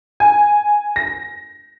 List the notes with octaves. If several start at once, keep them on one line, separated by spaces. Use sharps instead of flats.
G#5
A#6